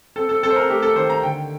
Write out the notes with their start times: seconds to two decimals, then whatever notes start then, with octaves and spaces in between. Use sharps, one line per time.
0.16 C4 A4
0.29 A4
0.43 C4 A4
0.50 C5
0.56 A#4
0.70 A3 G4
0.82 A4
0.96 D#3 C5
1.10 A#5
1.23 D3 G5